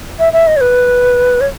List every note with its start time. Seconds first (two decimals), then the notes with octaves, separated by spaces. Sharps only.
0.19 E5
0.33 E5
0.47 D#5
0.56 C#5
0.61 B4
1.41 C#5